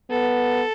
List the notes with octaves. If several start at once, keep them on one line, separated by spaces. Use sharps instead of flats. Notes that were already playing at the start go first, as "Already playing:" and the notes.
B3 A4